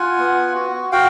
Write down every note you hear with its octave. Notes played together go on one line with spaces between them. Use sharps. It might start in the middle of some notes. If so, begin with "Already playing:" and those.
Already playing: F4 F#5 G#5
B3
F#4
F#4 F5 G5